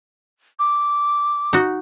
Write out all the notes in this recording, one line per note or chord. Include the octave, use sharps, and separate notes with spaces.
D6
D#4 F#4